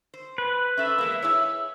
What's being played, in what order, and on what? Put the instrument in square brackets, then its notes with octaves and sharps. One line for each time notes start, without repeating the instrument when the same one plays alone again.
[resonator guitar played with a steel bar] C5
[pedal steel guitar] B4
[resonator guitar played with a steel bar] C#4 A4 C5 [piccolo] E5
[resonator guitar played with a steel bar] E2 G#3 A#3
[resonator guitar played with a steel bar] E4 G#4 C#5 [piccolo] E6